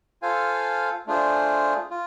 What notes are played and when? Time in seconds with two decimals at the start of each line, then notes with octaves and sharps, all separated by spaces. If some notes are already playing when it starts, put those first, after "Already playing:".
0.22 F4 A4 C5 F5 G#5
1.07 A3 D4 F4 G#4 C5
1.91 F4